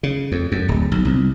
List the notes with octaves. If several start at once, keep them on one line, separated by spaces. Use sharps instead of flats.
C#3
F2
F#2
D1
B1
C2